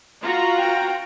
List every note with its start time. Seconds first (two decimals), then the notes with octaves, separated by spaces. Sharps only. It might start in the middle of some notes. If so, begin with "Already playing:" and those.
0.21 F4 F#4 A#5
0.59 G5